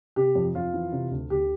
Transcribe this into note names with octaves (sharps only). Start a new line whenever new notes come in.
C3 G4
F2
F2 F4
E3
C3
D2
D2 G4